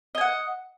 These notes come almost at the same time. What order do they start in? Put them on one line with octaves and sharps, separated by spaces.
D#5 G#5 F#5